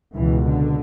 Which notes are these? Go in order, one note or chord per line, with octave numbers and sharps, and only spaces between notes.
C#2 B2 E3
D3